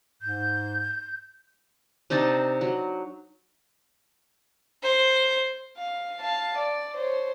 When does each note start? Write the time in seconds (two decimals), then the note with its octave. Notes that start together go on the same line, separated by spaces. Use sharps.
0.22 G#2 G6
2.10 C3 D4 D#4 A5
2.61 F#3
4.83 C5
5.77 F5
6.21 F5 A5
6.57 D5
6.96 C5 C#5